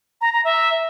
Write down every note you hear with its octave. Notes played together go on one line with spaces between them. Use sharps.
A#5
A#5
E5